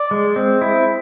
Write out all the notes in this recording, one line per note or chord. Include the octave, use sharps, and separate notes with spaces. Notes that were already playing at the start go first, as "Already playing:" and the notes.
Already playing: D5
G#3
C4
E4